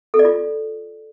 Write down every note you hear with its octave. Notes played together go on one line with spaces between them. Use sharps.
A4
D5
F4